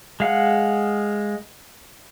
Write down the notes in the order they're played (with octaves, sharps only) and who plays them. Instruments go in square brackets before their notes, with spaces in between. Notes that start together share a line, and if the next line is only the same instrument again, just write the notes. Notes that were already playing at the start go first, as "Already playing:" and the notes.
[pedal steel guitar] G#3 F5 F#5